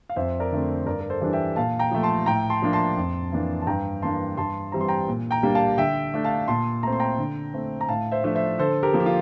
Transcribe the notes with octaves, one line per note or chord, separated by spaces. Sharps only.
F5
F2 C5 E5
A#4 D5
D3 A3 C4
G2 A#4 D5
A#4
A4 C5
E3 G3 D4
E5 G5
A#2 F5 A5
G5 A#5
F3 A3
A5 C6
A2 G5 A#5
A5 C6
F3 A#3 D4
A5 C6
F2
E3 A#3 D4
A5
G2 G5 A#5
E3 A#3 D4 A5 C6
G2 A5 C6
E3 G3 C4 A#5
C6
G5 A#5
A#2
G5 A#5
G3 A#3 D4
F5 A5
D3 E5 G5
A3 D4
F5 A5
A#2 A5 C6
A3 C4 A#5
C6
G5 A#5
D3
A3 C4
A#5
A2 F5 A5
C5 E5
F3 A3 D4
C5 E5
D3 A4 C5
G4 A#4
F3 A#3
G4
F4